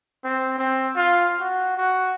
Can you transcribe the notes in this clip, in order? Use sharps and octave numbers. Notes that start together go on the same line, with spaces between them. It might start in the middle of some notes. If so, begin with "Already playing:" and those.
C4
C4
F4
F#4
F#4